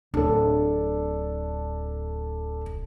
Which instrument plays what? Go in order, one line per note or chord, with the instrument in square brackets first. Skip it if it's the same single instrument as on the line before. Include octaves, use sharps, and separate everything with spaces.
[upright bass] D1 [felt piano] D4 A4